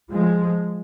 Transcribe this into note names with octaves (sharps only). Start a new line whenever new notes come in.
F3 G#3